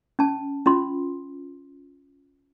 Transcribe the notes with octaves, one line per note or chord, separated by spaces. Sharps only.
C#4 A5
C#4 F4 C6